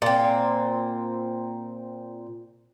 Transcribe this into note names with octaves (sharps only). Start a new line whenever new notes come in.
A#2 C4